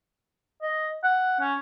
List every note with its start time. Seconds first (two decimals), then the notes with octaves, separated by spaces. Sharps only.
0.62 D#5
1.04 F#5
1.41 C#4